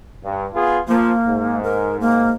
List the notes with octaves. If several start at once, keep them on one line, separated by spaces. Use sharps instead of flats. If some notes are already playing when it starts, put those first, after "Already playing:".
G2
B3 F4 G#4
F3 A#3
G#2
A#4
A#3